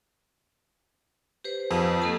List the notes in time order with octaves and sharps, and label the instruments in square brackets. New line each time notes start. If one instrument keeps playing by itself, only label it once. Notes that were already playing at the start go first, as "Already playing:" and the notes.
[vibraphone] G4 B4 C5
[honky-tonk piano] F2
[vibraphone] A#3 A4 A5